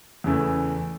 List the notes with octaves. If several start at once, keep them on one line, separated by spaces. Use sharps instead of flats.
E2 C#3 E3 A3